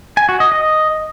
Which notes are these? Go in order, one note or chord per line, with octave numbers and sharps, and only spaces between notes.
G#5
F#4
D#5
D#5